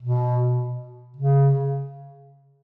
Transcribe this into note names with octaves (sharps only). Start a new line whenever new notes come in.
B2
C#3